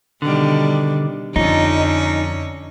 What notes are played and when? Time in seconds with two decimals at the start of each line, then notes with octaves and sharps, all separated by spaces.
0.22 B2 D3 D#3 G3
1.36 F2 D3 C#4 D#4 C#5